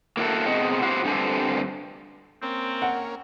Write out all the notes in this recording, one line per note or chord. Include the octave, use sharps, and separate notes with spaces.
A#3 E4 F#4 A4
B2 C4 G#4 D#5 F#5
E4 F#4 G4 C5
G2 D3 C4 G4 G#5
A#3 C4 C#4
F#5